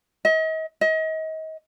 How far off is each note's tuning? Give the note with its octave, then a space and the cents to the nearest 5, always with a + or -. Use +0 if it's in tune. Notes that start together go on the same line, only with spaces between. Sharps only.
D#5 +40
D#5 +35